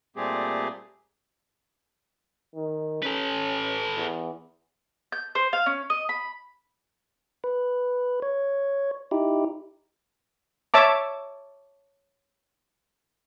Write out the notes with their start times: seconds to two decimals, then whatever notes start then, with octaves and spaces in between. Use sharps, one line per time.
0.16 A#2 G3 A3 C4 G4 G#4
2.55 D#3
3.03 C#4 A4 B4
3.97 E2
5.12 G6
5.35 C5
5.53 F5
5.66 C#4
5.90 D#5
6.09 B5
7.44 B4
8.22 C#5
9.11 D#4 E4 G4
10.74 C#5 E5 A5 D6